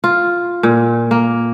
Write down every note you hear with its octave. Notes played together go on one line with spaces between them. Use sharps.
F4
A#2
A#3